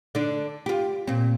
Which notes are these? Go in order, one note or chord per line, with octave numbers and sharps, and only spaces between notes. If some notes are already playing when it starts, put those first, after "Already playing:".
D3 D4
F4 G4
A#2 C4